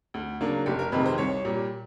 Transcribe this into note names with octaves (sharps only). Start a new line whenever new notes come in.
D2
C#3 F#3 A#3 D4
F1 G4
A#4
F2 C3 D#3 G#3 B4
C5
C2 C#5
A#2 G3